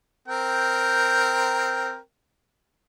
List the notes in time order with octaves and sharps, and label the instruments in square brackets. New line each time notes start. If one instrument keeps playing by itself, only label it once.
[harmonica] C4 A#4 G5